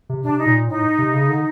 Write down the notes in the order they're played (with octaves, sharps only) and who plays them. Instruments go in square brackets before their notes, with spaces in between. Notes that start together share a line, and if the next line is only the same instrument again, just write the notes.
[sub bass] C3
[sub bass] C3 [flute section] D4
[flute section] D#4
[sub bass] A#2
[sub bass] A2 [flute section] D#4
[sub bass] C3
C#3
D3